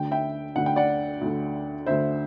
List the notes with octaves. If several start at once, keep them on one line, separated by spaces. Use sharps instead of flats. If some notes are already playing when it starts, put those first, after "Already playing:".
Already playing: D2 D3 G5
E5 G5
D2 D3 F#5
G5
D5 F#5
D2 D3
D2 D3 C5 E5